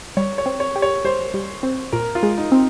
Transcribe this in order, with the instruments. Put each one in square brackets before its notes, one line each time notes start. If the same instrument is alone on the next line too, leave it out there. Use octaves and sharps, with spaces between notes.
[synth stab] G3 [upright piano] C#5
[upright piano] C#5
[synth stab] C4
[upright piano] C#5
[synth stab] G4
[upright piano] C#5
[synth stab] G3 [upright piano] C5
[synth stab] G3
C4
[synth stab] A#2 [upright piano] A#4
[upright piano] F4
[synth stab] G#3
[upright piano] D#4
[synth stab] C4